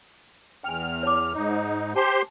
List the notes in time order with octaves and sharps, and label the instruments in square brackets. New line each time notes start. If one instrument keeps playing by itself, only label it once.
[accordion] E2 F6 [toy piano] G5 G#5
[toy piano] C#5 A5 D6
[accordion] G#2 D#4
[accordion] G4 C5 C6 [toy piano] G#5 A5